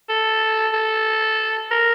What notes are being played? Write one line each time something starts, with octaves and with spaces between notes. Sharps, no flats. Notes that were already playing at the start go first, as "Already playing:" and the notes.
A4
A4
A#4